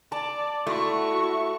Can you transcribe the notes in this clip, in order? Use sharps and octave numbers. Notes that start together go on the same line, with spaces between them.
D5 A5
A3 E4 F#4 C#6